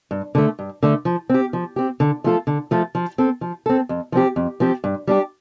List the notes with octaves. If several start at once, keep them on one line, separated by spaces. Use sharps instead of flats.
G2
D3 A3
G2
D3 A3
F3
C4 G4
F3
C4 G4
D3
F3 A3 F4 A4
D3
F3 A3 F4 A4
F3
C4 A4
F3
C4 A4
F2
F3 C4 G4
F2
F3 C4 G4
G2
G3 D4 G4